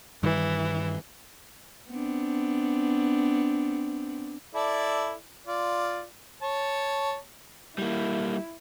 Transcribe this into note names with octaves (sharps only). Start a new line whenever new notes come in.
G2 D#3 E3 G3
B3 C4 D4
E4 A4 D5
F4 D5
C#5 A5
G3 A#3 E4